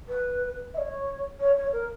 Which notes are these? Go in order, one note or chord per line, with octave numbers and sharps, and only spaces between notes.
B4
E5
C#5
C#5
C#5
A#4